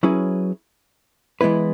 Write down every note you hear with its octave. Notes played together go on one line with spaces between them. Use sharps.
F#3 C#4 E4 G#4 B4
E3 G#3 B3 E4 B4